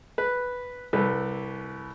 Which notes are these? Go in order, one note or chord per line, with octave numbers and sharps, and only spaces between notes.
B4
C2 A4 B4